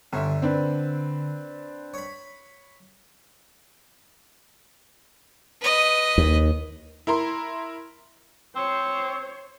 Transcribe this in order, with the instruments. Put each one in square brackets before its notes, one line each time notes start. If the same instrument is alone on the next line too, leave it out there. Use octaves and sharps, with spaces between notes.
[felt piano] G1 E5 [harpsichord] D3
[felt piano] C4 D4 B4
[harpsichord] C#5 B5
[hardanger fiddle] B4 D#5
[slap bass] D#2
[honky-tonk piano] E4 A#4 A#5 C6
[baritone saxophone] C4 [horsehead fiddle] C5 C#5